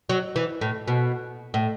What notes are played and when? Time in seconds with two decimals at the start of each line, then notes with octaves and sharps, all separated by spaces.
0.09 F#3
0.36 E3
0.61 A2
0.88 B2
1.54 A2